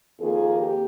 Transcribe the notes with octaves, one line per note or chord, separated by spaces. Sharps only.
F2 D#3 A#3 F4 G#4
G4